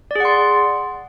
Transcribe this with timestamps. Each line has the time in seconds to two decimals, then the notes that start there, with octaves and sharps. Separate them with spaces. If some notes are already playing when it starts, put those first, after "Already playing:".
0.11 D5
0.15 G#4
0.20 F#5
0.25 C6